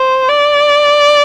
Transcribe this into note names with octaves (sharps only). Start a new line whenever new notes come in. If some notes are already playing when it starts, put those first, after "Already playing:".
Already playing: C5
D5